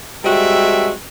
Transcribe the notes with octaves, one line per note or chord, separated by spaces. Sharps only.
G3 G#3 C4 F#4 A4 E5